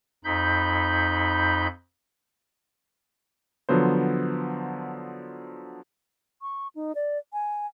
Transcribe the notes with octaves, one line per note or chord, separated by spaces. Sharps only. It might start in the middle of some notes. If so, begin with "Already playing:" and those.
F2 D#4 B5 G6
D3 F3 F#3 B3 C5
C#6
D#4
D5
G#5